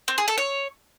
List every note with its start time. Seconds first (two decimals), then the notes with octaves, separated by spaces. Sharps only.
0.08 C4
0.18 G#4
0.28 A4
0.38 C#5